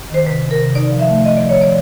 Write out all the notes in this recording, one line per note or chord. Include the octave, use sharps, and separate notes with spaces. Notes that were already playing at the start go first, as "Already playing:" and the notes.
D#3 C5
C3 B4
D#3
A#4
C3
D#4 D5
F3
E5
A3
F3 D#5
D5
F3
C#5
F3 D5